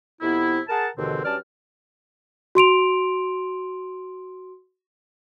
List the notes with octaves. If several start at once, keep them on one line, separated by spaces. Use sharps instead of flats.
F2 C3 B3 E4
G#4 A#4 F#5 A5
D#2 G#2 B2 D3 E3 C4
G2 F#3 C#4 D5 A5 F6
F#4 C6 D7 F7